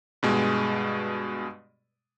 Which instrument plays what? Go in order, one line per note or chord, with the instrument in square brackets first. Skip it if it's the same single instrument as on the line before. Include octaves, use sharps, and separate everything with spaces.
[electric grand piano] G2 B2 G#3